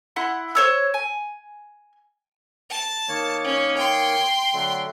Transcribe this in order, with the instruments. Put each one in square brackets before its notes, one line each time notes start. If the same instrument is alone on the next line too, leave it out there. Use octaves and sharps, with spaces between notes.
[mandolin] E4 F#5 C6
C5 C#5 E6
G#5
[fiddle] A5
[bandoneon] D#3 A#3 C#5
[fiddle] C#4
G5 C6
[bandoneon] D3 F#3 A3